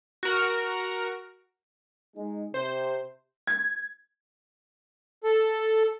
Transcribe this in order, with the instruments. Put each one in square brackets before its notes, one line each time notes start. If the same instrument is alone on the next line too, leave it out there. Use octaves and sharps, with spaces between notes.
[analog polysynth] F#4 A#4
[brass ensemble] G#3 D#4
[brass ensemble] C3 [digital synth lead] C5
[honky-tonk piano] G#6
[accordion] A4